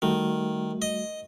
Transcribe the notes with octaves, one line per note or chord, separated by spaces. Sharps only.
D#3 G3 A3 F#4
D#5